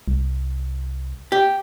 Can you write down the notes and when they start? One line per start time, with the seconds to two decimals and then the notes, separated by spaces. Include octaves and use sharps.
0.08 C2
1.32 G4